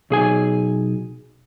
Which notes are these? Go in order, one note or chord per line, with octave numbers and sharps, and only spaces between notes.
B1 G#4 G#5